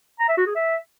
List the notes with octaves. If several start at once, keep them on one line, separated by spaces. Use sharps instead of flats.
A#5
E5
F#4
G#4
E5